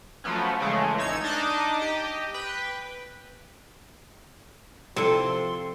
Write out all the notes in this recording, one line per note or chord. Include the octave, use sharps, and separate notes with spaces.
F3 F#3 A3 B3 C#4
C#3 E3 G#3 A3
A1 D#4 C#5 E6 G#6
D4 D#4 D#5 A5 D6
G4 D#5
B4 G5
C3 F3 E4 A4 C6